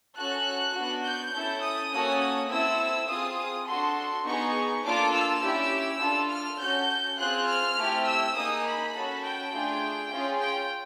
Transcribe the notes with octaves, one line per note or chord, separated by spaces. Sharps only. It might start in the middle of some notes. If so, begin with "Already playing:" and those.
C#4 F#4 A4 F#6
B3 D4 F#4
G6
C#4 E4 A4
D#6
A#3 C#4 F#4 A4
C4 E4 A4 E6
C4 F4 G#4 D#6
D4 F#4 A4 C6
B3 D#4 G#4 C#6
A#3 D4 F4 A4 D6
E6
C#4 E4 G4
D4 F4 A4
F6
C#4 F#4 A4 G6
C4 F4 G#4 F#6
F6
A3 C4 E4 G4
E6
A#3 D#4 G#4 D#6
B5
C#4 F#4 A4
G5
A3 D4 F4 G#4
C#4 F4 G#4
G5